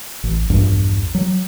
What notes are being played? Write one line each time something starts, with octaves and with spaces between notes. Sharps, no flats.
A1
A#1 E2 G2
F#3